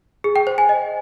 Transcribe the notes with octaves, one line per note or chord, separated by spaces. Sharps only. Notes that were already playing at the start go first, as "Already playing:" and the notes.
G#4
G5
C5
G#5
D#5